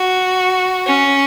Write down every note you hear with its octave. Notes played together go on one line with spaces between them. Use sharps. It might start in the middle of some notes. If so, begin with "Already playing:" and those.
Already playing: F#4
C#4